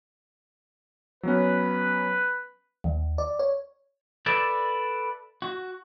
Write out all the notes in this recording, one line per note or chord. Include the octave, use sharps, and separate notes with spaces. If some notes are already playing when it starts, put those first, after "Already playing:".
F#3 B3 C#4 B4
D#2
D5
C#5
A4 B4 D5 E5
F#4